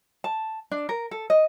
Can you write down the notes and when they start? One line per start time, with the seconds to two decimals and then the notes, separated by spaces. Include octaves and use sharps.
0.24 A5
0.71 D4
0.89 A#4
1.11 A4
1.30 D#5